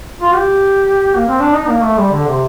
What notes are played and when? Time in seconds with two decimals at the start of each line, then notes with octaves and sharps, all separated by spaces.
0.20 F4
0.35 G4
1.15 A#3
1.28 C4
1.40 D4
1.53 D#4
1.68 A#3
1.83 A3
1.97 G3
2.11 D3
2.27 C3